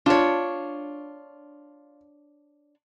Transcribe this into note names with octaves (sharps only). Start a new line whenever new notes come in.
D4 F4 C#5